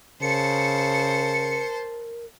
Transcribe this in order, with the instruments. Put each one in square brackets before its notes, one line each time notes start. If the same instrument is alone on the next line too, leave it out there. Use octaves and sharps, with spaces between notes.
[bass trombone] C#3 [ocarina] A#4 [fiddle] C5 A5 [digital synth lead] C#7